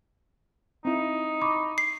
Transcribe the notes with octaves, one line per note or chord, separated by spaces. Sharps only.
C4 D#4 E4
B5 C#6 D6
C7